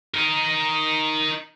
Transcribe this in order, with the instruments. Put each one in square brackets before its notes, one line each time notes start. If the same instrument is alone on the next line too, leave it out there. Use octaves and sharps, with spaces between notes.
[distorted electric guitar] D#4 A#4